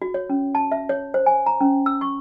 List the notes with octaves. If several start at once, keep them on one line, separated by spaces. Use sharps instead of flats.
F#4
C#5
C#4
A5
E5
C#5
C5
G#5
A#5
C#4
E6
C#6